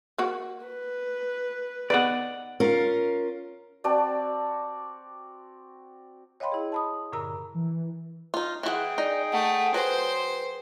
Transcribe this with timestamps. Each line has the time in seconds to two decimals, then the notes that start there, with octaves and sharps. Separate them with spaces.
0.18 A#3 F#4
0.65 B4
1.90 B3 D#4 B4 D5 F#5
2.60 C#4 F4 A#4
3.84 C4 F#4 D5 A5
6.40 C#5 D#5 F5 G5 B5 C6
6.52 E4 G#4
6.72 A5 B5 D#6
7.12 G2 A#2 D3 A#4 A#5 E6
7.54 E3
8.34 D#4 F4
8.63 E3 F#4 G#4 F#5 G5
8.98 D#4 D5
9.32 A3 F#5
9.74 F#3 B4 C5